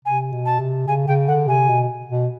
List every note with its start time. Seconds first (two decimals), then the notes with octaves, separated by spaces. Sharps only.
0.05 C3 G#5
0.32 B2
0.45 A5
0.59 C3
0.87 C#3 G#5
1.07 C#3 G5
1.27 D3 F#5
1.48 C3 G#5
1.69 B2
2.09 B2